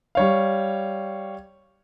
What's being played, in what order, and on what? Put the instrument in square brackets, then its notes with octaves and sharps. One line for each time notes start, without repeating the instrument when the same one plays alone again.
[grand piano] G3 C#5 F5